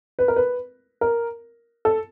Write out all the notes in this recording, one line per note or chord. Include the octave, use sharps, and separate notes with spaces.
B4
A#4
B4
A#4
A4